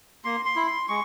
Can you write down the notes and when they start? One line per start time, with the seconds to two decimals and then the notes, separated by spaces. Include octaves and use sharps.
0.24 A#3 C6
0.45 C6
0.56 E4
0.67 C6
0.88 G#3 C#6